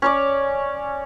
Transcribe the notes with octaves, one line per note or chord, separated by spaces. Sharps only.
C#4 C#5 D5